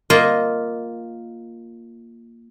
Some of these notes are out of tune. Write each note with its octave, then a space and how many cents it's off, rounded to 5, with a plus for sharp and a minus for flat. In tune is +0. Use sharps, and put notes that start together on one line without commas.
A#3 +0 F4 +0 D#5 +0